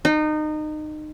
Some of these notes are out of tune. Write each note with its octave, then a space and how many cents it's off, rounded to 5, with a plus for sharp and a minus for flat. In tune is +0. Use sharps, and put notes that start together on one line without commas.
D#4 -25